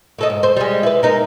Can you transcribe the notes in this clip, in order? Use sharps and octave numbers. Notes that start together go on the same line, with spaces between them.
A2 A4 D#5
G#2
C5
G3 G#3
E4 B4
G#3 D#4 A#4